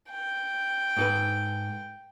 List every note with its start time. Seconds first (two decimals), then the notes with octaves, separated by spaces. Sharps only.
0.12 G5
0.97 G#2 A4 B4